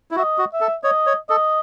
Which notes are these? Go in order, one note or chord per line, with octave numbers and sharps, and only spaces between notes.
E4
F#4
E5
D#5
F#4
E5
A4
C#5 D#5
C#5
A4 D#5